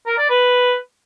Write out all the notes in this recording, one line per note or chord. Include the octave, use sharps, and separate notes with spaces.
A#4
D5
B4